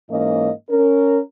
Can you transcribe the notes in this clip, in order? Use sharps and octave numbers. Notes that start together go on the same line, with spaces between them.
G#2 E3 A#3 C#4 D#5
C#4 A#4